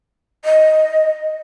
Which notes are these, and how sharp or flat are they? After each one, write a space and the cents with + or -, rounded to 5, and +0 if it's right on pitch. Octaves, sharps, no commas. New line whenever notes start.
D#5 +10